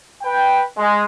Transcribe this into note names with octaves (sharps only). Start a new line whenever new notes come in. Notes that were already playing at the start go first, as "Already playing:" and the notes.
B4 G5
G#3